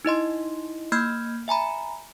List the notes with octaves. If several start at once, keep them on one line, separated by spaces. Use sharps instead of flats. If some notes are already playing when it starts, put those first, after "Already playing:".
D#4 E4 D#5 C6
A#3 B5 F6 G6 G#6
E5 G#5 A#5 B5